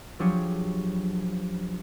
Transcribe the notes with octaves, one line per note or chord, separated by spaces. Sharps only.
F3 F#3 D4 G4 G#4 C#5